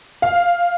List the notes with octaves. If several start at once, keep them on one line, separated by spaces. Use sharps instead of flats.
F5